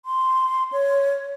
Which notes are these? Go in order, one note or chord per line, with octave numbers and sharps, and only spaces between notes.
C6
C#5